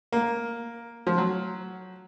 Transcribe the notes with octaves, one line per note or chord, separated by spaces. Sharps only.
A#3
F3
F#3